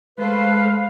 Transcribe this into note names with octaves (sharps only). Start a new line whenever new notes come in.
G#3 A3 B4 C5 F5